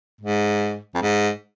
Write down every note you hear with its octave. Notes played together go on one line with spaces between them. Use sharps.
G#2
F2
G#2